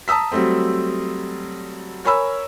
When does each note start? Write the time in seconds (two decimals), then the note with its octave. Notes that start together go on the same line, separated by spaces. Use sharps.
0.08 A5 A#5 D#6 E6 B6
0.32 F#3 G3 A3 C4
2.05 A#4 C#5 G#5 B5 E6